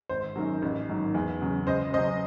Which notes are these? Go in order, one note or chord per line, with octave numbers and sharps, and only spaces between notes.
G#1 C5
F#2 D#3 F#3
A1
G#2 D#3 F#3
E2
C#3 F#3
C#2 C5 D#5
C#3 F#3 C5 D#5